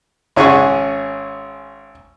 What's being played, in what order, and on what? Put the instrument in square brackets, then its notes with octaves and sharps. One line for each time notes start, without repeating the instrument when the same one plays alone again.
[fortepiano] G#1 C#4 G#4 C#5 F#5 C#6